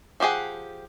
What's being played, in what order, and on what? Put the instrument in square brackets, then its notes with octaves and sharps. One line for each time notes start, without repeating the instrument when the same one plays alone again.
[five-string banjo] F3 G3 G4 G#4 F#5